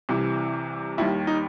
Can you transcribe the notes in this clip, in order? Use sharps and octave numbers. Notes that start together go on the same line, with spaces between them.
C2 C3 E3
D#2 D#3 G3 E4
D#4